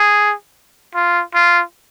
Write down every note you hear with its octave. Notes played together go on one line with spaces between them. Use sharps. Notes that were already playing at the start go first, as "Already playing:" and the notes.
Already playing: G#4
F4
F4